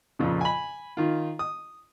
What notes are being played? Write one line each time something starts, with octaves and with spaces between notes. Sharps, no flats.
F2 A#2 C#3
G#5 B5
D#3 F4
D#6